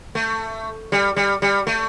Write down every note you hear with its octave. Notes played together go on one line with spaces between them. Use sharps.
A3
G3
G3
G3
A3